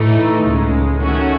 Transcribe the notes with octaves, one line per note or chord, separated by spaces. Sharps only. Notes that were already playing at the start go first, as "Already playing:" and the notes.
Already playing: A2 E3 A3 D#4
C#2 C#3 G#3
D#3 A3 C#4 F#4